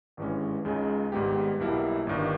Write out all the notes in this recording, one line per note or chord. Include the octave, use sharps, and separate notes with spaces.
G#1 G2 E3 G#3 C#4
C#2 C#3 G#3 D#4 G#4
G#1 G#2 G3 B3 G4
B1 B2 G3 A#3 E4
G1 G2 D#3